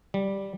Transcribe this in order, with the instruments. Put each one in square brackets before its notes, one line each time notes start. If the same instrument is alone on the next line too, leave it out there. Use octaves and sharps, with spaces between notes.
[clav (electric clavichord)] G3